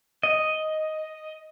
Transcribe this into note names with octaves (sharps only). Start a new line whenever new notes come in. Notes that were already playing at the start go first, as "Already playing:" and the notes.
D#5